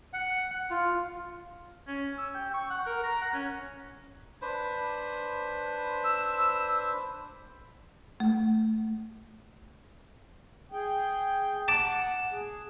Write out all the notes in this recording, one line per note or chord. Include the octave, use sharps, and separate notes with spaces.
F#5
F4
C#4
E6
G5
C#6
F#5
A#4
A#5
F#5
C#4
D4 B4 C5
E6
A3
G#4 G5
F#5 A5 D6
G#4